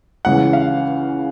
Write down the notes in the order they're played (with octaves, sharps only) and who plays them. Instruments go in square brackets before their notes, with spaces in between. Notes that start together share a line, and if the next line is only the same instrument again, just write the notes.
[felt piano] C#2 C#3 E3 [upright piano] F#5
[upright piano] F5